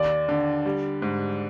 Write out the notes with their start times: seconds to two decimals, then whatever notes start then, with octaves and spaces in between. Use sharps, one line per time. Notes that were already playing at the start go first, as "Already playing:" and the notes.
Already playing: D#2 D5
0.29 D3
0.66 G3
1.02 G#2